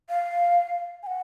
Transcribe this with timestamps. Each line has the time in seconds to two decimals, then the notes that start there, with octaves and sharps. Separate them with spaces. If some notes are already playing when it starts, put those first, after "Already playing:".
0.10 F5
1.03 G#5
1.07 F#5